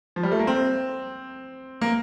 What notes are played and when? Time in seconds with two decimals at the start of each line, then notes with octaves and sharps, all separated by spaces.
0.16 F3
0.23 G3
0.32 A3
0.39 A#3
0.47 C4
1.81 A#3